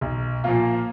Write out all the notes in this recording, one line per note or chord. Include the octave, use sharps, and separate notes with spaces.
B1
A#2 F3 A#3 F4